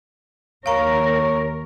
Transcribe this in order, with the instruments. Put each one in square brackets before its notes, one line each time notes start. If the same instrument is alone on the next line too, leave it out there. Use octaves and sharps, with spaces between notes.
[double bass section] D#2 [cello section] A#4 [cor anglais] C#5 [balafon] F5 A#5